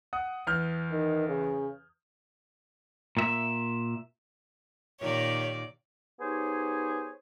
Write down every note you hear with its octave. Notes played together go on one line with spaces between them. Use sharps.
F#5 D#6
E2 F6 G6
D#3
C#3
A#2 E5
A#2 D#3 G4 C#5 D5
B3 D#4 G4 G#4 C5 C#5